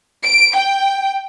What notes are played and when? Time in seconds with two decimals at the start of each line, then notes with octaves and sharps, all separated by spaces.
0.24 D7
0.56 G5